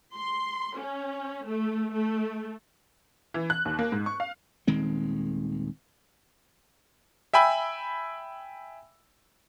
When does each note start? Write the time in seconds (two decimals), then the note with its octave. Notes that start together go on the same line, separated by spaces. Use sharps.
0.15 C6
0.77 C#4
1.46 A3
1.93 A3
3.34 E3
3.50 F#6
3.65 D#2
3.79 A#3
3.92 G#2
4.06 C#6
4.20 F5
4.67 D#1 D#3 G#3 C4
7.34 E5 G5 G#5 B5 E6